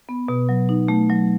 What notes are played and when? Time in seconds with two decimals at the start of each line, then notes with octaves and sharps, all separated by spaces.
0.09 B3
0.28 B2
0.49 F#3
0.69 D#4
0.88 A3
1.10 F#3